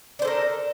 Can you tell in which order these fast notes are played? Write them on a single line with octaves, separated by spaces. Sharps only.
D4 C5 A4 A#4